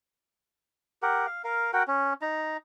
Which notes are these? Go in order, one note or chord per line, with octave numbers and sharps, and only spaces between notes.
G4 A#4 F#5
F5
A#4 F5
F#4 A#4 F#5 G5
C#4
D#4 A#5